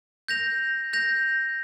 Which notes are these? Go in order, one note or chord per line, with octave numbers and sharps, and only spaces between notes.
G6 A#6 F7
G6 A#6 F7